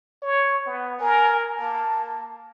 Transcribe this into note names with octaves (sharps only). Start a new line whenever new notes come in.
C#5
B3
A#4 G#5
A#3 A5